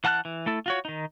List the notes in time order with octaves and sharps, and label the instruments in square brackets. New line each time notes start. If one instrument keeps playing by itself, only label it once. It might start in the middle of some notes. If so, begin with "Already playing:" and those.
[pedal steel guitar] E3 F#5 A5 F6 F#6
E3
A3 E4 A4
F4 F#4 C#5
D#3 D#4